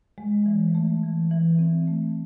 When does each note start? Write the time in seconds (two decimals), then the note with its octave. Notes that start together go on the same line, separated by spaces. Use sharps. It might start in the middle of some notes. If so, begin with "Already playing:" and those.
0.18 G#3
0.46 E3
0.75 A3
1.03 E3
1.31 E3
1.59 C4
1.87 A3